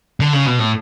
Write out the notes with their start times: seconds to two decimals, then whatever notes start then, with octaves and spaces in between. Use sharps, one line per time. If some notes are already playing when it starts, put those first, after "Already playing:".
0.20 D3
0.33 C#3
0.46 B2
0.59 A2